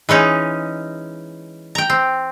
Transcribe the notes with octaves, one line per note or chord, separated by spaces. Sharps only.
E3 G#3 C#4 D#4
G5 A#5
C4